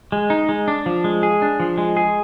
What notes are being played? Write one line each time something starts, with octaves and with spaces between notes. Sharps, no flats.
G#3
D#4
G#3
D4
F3
G#3
G#4
D4
F3
G#3
G#4